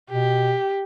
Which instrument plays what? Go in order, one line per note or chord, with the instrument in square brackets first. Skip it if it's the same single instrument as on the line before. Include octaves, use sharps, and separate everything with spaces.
[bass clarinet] B2 [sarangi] G4